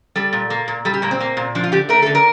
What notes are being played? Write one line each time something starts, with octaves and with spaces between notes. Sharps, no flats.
G3 A4
A#2
A#3
A#2
G3 A4
G4
A#2 A#3
C4
A#3
A#2
F3 D4
F4
D3 G4
A3 A#4
D3 A4
A#4